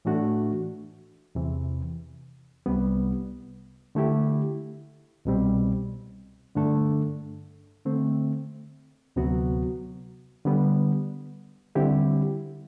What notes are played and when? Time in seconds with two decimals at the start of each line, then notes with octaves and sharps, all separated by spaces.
0.05 A2 E3 A3 D4 F#4
1.35 E2 C3 E3
2.66 C2 C3 G3 B3
3.95 D3 A3 E4 G4
5.25 C2 B2 G3 C4
6.55 G2 D3 A3 D4 A4
7.85 D3 A3 C4
9.16 D2 C3 F#3 B3 F#4
10.45 D3 G3 B3
11.75 D3 G3 C4 E4 G4